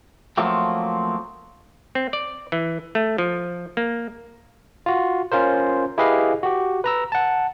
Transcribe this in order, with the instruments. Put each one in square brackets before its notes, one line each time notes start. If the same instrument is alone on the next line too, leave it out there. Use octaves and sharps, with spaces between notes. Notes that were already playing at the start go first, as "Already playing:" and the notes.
[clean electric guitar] F3 F#3 A3 A#3 C4
[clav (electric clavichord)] C4
D5
E3
A3
F3
A#3
[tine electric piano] F4 F#4
C#4 F4 A#4 C5
E4 G4 G#4 B4 D#5 F5
F#4 G4
B4 A#5 E6
F#5 A5